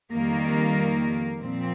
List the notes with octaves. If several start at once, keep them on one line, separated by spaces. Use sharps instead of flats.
F2 D#3 G3 A#3
A#2 F3 C4